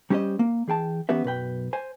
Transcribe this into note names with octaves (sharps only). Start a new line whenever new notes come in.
G3 C#4 G4 G#4 C5 D#5
A#3
E3 G#4 G5 A5
E3 B3 C#4 G4 B4 E5
B1 F#2 B4 G5
C5 G#5